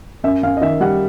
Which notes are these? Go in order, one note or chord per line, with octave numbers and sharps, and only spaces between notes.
F#2 E5
F#2 F5
D#5
D#3 E5
G3 F#5